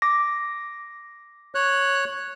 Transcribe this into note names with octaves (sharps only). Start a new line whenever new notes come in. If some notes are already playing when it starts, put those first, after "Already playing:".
D6 A#6
C#5 F#6